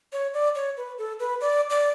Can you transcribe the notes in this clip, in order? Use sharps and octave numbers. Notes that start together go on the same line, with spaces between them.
C#5
D5
C#5
B4
A4
B4
D5
D5